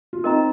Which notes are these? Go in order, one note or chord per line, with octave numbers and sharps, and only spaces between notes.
F4
C4 D#4 A#4 D#5 A#5